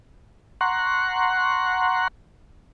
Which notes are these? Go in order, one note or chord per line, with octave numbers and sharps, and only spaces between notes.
F#5 A#5 C6 C#6 F#6